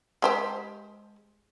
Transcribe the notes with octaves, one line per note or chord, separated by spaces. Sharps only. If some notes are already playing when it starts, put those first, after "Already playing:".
G#3 G4 C5